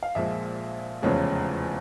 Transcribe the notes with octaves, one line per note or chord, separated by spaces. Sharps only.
F5
A#1 A#2 F3 G#3 E5
F1 E2 C#3 F3 G#3 C#5